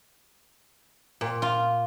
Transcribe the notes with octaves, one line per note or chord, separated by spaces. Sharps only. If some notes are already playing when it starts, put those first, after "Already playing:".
A#2
F4